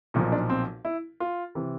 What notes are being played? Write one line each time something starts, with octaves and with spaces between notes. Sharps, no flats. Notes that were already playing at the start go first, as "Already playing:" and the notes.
B1 A#2 F3 D#4
D4
C4
E4
F4
C3 E3